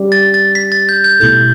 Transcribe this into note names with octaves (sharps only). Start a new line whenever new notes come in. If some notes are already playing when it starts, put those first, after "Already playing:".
Already playing: G3 C#4 G4 D5
A6
A6
B6
A6
G6
G6
B2 A3 E4 A4 G6